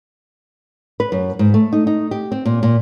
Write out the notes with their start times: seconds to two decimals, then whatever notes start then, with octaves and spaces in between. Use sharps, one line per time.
1.00 B4
1.12 F#2
1.39 G#2
1.54 A3
1.73 D#4
1.87 D#4
2.11 G4
2.32 C4
2.45 A#2
2.63 A#2